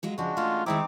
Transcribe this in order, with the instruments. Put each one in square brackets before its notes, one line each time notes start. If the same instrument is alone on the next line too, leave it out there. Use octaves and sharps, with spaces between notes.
[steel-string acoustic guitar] F#3 G#3 F4
[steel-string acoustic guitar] C#3 F3 [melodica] G#3 D4 F#4
[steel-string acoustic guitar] A3 C#4 [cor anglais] F4
[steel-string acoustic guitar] D#3 G#3 C5 [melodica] C4 D#4 D6 [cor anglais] E4